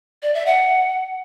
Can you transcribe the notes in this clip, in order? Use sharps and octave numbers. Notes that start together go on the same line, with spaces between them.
D5
E5
F#5